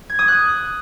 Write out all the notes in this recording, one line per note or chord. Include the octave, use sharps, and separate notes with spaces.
G#6
D#6
F#6